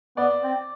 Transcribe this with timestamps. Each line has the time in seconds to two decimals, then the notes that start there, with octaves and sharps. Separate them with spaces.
0.17 B3 D5
0.43 C4